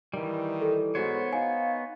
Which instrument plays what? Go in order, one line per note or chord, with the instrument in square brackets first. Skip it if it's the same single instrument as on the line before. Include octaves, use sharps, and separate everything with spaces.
[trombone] D#3 [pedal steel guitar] E3 G3
[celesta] A4
[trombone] G#2 [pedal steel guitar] B3 C5 C#5 [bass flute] F#4
[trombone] D#4 [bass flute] F5 [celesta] G#5